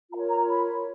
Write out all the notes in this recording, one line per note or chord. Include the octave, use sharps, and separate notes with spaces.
F4 A#4 C#5 A#5
A#5
B5